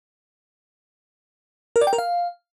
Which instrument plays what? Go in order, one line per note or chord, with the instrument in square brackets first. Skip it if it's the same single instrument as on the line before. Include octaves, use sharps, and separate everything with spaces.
[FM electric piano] A#4
D5
G5
A#4
F5